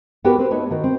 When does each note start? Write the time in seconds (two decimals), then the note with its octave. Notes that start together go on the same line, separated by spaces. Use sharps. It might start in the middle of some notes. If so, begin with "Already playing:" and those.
0.24 B3 F#4 G4 A#4 B4
0.38 C4 B4 C5
0.50 A3 D#4 B4 C#5
0.71 D#3 F#4
0.84 C4